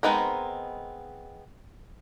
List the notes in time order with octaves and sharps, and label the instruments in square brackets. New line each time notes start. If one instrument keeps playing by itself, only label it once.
[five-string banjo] G#3 B3 C4 D#4 A#4